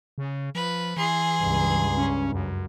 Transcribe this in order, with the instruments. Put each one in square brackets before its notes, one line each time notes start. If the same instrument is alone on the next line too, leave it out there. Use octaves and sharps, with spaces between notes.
[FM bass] C#3
[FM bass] F3 [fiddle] B4
[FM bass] E3 [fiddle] G#4 C6
[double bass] C#2 G2
[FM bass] C#4
F#2